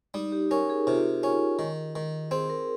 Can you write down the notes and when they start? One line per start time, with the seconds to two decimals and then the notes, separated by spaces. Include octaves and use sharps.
0.14 G3 D#4
0.32 G4
0.51 C#4 A#4
0.70 G#4
0.87 C3 F4
1.23 C#4
1.59 D#3
1.96 D#3
2.31 C4 G#4
2.50 A#4